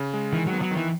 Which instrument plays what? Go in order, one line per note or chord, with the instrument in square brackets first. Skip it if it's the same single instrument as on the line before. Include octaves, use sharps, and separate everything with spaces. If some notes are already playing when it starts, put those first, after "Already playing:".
Already playing: [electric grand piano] C#3
G#3
[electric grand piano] D#3 [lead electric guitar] E3
[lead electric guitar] F#3
[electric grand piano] B3
[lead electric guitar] F#3
[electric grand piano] D#3
[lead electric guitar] E3